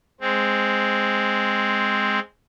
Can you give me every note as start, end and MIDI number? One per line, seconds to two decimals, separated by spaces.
0.21 2.19 56
0.21 2.19 60